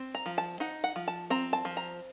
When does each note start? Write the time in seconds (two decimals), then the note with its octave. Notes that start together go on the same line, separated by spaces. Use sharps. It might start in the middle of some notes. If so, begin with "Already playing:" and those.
Already playing: C4
0.15 A#5
0.26 F3
0.38 A5
0.60 D#4 F#5
0.84 F#5
0.96 F3
1.08 A5
1.30 C4 A#5
1.53 A5
1.65 F3
1.77 A#5